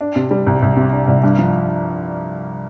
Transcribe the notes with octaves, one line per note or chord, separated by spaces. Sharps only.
D4
C3
G3
C2
C2
C3
D4
C2
G2
F3